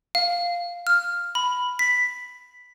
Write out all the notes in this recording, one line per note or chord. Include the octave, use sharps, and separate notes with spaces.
F5
F6
B5
B6